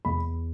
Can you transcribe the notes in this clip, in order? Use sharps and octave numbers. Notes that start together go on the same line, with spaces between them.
E2 B5